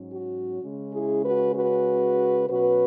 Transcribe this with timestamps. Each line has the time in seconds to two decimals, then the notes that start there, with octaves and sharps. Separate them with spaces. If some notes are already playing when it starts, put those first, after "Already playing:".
Already playing: G#2 F#3 C#4
0.14 F#4
0.61 C#3 G#3 C#4
0.92 E4 G#4
1.24 F#4 B4
1.55 F#4 B4
2.49 B2 F#3 C#4 F#4 B4